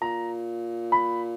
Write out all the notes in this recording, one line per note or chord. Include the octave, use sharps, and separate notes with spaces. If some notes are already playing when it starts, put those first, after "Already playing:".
A#2 A#5
B5